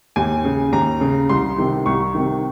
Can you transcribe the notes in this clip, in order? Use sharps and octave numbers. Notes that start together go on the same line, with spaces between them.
D#2 G#5
C#3
D#2 A#5
C#3
C2 C6
C3 D#3
C2 C#6
C3 D#3